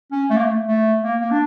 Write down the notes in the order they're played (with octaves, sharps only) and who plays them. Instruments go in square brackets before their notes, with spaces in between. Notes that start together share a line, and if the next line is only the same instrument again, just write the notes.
[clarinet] C#4
A3
A#3
A3
A3
A#3
A#3
D4